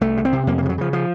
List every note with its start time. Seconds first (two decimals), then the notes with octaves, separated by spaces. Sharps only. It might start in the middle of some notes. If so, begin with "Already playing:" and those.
0.01 C2 A3
0.17 C3
0.25 C4
0.33 C3
0.47 F2 A#3
0.58 A#3
0.62 C#3 F3
0.69 F#3
0.78 C#3 F3
0.93 F3